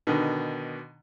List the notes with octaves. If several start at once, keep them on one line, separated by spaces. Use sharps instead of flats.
B2 D3 D#3